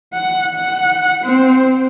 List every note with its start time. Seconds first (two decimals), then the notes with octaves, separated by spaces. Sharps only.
0.14 F#5
0.55 F#5
1.24 C4